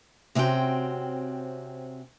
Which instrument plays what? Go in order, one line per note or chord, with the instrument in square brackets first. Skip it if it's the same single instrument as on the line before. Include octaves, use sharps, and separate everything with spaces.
[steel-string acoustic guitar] C3 C4 C#4 F#4 G5